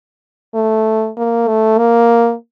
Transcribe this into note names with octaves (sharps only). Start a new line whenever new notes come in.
A3
A#3
A3
A#3